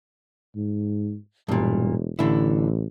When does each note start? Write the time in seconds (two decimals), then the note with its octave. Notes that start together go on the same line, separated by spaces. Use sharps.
0.56 G#2
1.48 E1 G2 A#2
2.19 A1 D3 E4